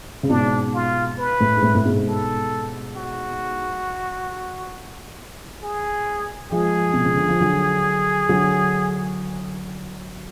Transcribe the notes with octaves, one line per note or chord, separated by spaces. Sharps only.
C#3
G#2 B2 D4
F4
B4
A2
G#2
A2
A2
G#2 B2
A4
F#4
G#4
F3 G#3 G#4
B2
C#3
D3
F3
D3 F#3
D3 F#3